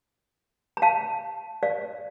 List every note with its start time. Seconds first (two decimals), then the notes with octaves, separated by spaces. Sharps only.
0.77 A#5
0.82 F5 A5
1.63 D5 F5